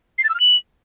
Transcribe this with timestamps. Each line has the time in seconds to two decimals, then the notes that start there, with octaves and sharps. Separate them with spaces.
0.18 C7
0.24 A6
0.29 E6
0.34 F6
0.40 F#7